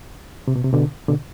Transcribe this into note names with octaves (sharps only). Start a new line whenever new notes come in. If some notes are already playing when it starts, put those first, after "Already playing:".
C3
B2
C3
B2 D3
B2 D3